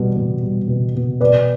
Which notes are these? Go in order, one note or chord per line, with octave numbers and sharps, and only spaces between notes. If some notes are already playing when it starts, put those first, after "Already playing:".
Already playing: B2 G3
B2
G3
B2
B2
B2 B4 D5